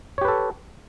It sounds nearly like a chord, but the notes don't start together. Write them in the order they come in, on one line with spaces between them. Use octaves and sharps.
C#5 G4 B4 A4